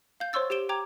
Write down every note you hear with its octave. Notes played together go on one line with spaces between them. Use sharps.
F5 G6
C5 C#5 C6 C#6 E6 A6
G4 C5 D7 E7 G7
G5 A#5 D6 G#6 F7